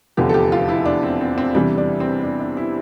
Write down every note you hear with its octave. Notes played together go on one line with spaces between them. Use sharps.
F1 E2 D3 F3 G4
A4
G4
F4
E4
D4
C4
C4
C4
E2 C3 E3 G3 D4
D4
C4
D4
D4
E4